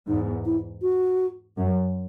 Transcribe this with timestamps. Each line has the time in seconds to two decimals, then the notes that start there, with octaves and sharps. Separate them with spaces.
0.08 E2 G#2 D#4
0.46 E4
0.82 F#4
1.57 F#2